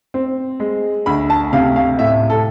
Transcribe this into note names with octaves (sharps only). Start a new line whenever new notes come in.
C4
G#3
D2 B5
A5
C3 F5
F5
A2 E5
A4